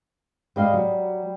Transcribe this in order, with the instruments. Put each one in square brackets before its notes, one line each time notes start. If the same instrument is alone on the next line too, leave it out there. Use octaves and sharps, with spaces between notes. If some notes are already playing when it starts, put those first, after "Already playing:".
[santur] G3 [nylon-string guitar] G#3 D#5 F5
[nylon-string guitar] F#3